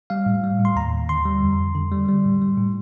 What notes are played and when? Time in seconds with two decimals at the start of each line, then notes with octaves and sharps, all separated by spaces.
0.10 G3 F5
0.26 A2
0.43 G3
0.59 A2
0.65 C6
0.76 D#2 A#5
0.93 D#2
1.09 D3 C6
1.25 G3
1.42 F2
1.59 F2
1.75 D3
1.92 G3
2.08 G3
2.25 A2
2.41 G3
2.58 A2